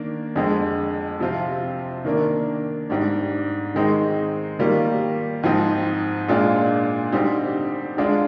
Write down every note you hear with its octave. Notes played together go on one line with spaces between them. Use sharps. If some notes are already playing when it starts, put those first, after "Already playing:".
Already playing: D#3 A#3 D4
F2 D3 G#3
C3 F3 C4 F4
D#3 A#3 D4
G#2 G3 D4
D#3 G#3 C4 D#4
D#3 G3 A#3 F4
G#2 F3 C4 D#4
A#2 G#3 D4 F4
D3 G3 C4 D#4
D3 G#3 D4 F4